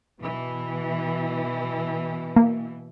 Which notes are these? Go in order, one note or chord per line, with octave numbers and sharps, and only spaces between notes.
B2 E3
A#3